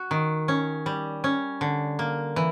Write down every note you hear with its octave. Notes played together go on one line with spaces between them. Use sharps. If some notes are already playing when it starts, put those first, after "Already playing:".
Already playing: F#4
D#3
C#4
G3
C#4
D3
A#3
E3